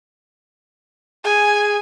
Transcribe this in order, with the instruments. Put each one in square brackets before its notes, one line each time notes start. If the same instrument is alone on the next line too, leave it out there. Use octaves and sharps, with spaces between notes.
[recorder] G#4 [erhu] G#5